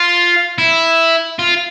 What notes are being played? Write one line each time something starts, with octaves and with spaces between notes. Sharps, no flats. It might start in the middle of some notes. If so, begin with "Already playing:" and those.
Already playing: F4
E4
F4